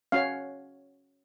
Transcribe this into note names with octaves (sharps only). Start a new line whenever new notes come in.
C#4 F#4 C#5 F5